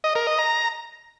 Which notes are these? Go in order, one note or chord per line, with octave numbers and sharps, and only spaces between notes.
D#5
A#4
D#5
A#5